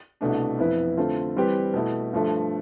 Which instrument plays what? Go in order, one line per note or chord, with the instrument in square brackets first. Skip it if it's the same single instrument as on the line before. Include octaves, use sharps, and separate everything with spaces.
[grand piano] C2 B2 A3 D4
F2 E3 B3 E4 B4
D3 A3 C4 F4
E3 G3 C4 G4 B4
B2 A3 E4
G2 F3 A3